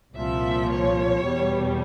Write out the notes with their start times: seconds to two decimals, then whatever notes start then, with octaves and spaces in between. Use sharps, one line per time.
0.15 C2 A#2 F3 E5
0.69 C#5
1.23 E2 B2 G3